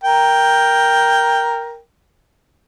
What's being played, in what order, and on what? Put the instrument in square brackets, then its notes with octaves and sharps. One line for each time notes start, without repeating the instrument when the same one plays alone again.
[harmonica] A#4 G5